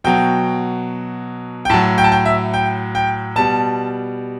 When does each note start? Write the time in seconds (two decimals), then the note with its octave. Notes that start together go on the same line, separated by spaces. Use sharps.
0.04 B2 F#3 G5
1.65 G5
1.70 A2 A5
1.74 F#3
1.98 G5
2.04 A5
2.12 G5
2.25 E5
2.54 G5
2.95 G5
3.36 B2 G3 A5